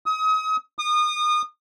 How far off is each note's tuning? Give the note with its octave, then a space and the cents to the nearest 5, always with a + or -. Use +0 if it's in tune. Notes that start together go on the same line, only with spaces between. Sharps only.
D#6 +35
D#6 -30